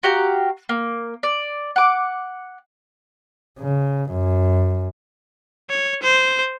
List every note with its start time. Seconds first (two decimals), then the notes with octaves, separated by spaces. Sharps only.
0.03 F#4 G4 F5 A#5
0.69 A#3
1.23 D5
1.76 F#5 D6
3.59 C#3
4.09 F#2
5.69 C#5
6.03 C5